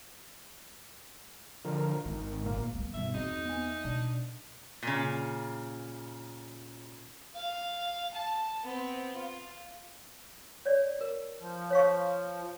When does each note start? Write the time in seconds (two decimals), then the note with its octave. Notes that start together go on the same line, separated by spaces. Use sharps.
1.65 D3 F3 A#4
2.06 G#1 D#3
2.46 A#2 A#3
2.75 G3 B3
2.94 G2 B2 D#3 E5
3.14 E2 C4 D#4 F#4 G#4
3.45 B3 G#5
3.67 E5
3.84 B2 D4
4.83 A#2 C#3
7.35 F5
8.14 A5
8.63 B3 C4
9.15 F4
10.66 C#5 D5
11.01 A#4
11.41 F3
11.71 C#5 F5 C#6